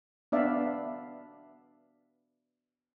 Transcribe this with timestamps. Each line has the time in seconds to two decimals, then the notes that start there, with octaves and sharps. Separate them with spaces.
0.32 B3 D4 D5 E5 F5